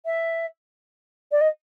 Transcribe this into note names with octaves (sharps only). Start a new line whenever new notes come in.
E5
D5
D#5